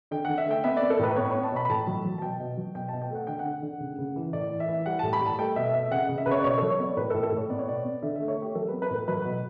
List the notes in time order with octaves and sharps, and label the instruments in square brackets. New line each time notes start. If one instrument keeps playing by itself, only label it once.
[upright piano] D3 G5
D3 F#5
E5
A3 G5
B3 E5
B3 D5
A4
A2 B4
B4
B3 C#5
B3 C#5
A5
B2 B5
B5
A2 A5
F#3
F#3
A5
B2 G5
B2
F#3
B2 G5
B2 A5
G5
A3 F#5
D3 G5
F#5
D3
D3
C#3
C#3
E3
A2 D5
E3
E5
E3
G3 F#5
A2 A5
B5
G3 A5
A3 G5
B2 E5
B2 E5
E5
C#3 F#5
C#3
E5
C#3 B4
C#5
D5
B2 C#5
F#3 A4
C#5
B3 D5
A2 B4
A4
A2
A4
A2 C#5
B3 D5
C#5
B2 D5
B3
D3 E5
A3 E5
C#5
A3 G4
F#3 A4
B3 B4
B4
A2 A4
F#3 B4
B2